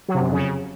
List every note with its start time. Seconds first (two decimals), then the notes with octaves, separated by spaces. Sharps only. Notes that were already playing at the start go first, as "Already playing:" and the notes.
0.08 F#3
0.14 C3
0.20 F#2
0.26 F2
0.32 C#3